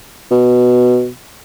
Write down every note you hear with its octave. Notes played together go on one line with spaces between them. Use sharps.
B2